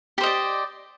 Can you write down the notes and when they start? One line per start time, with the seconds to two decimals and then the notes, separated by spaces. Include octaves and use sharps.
0.18 G4
0.21 C5
0.23 D#5
0.26 D5